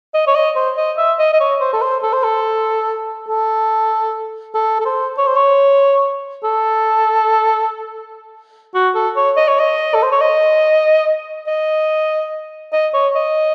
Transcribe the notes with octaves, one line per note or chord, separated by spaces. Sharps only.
D#5
C#5
D#5
C5
D#5
E5
D#5
D#5
C#5
C5
A4
C5
A4
C5
A4
A4
A4
A4
C5
C#5
C5
C#5
A4
F#4
A4
C#5
D#5
C#5
D#5
A4
C5
C#5
D#5
D#5
D#5
C#5
D#5